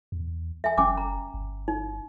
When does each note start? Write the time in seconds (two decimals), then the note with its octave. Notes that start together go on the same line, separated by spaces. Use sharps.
0.12 E2
0.64 E5 G#5
0.78 F#1 C#4 G#5 D6
0.97 A#5
1.34 G1
1.68 D#4